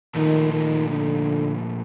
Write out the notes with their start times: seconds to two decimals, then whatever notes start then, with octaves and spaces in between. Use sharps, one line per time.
0.15 A#2 D#3 F3 A3 D#4
0.52 D#3
0.89 D3